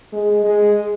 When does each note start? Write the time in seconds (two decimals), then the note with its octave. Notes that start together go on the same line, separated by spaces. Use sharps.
0.12 G#3
0.44 G#3